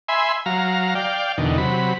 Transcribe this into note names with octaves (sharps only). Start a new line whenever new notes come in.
E5 G#5 B5 C6
F#3 F5 A#5
D5 F5 G5
E2 B2 D3 D#3
C3 F#3 B5